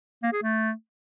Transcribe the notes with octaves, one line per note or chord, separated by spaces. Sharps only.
A#3
G#4
A3